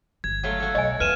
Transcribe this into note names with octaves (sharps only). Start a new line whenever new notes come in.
G1 G#6
F#3 A3 F4
F#4 A4
B1 C#5 D#5 G#5
E2 F4 B4 F6 D#7 E7